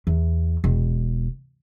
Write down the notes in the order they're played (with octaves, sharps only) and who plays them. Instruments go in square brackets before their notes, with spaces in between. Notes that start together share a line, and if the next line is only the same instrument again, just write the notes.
[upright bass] E2
E1